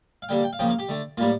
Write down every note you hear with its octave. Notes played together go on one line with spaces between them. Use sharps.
F5
D3 G3 A#3 G5
G5
F5
C#3 F3 A#3 G5
F5
G4
D3 A3
A2 G3 A#3 F4